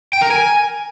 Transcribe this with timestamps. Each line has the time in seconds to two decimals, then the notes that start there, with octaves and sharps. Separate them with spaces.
0.13 G5
0.22 A#4
0.30 G#5